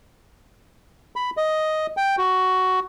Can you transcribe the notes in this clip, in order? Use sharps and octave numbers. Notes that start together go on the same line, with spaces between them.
B5
D#5
G5
F#4